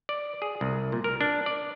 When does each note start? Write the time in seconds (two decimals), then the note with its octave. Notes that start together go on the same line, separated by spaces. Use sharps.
0.09 D5
0.42 G#4
0.61 C2
0.92 A#2
1.04 A#4
1.21 D4
1.46 D5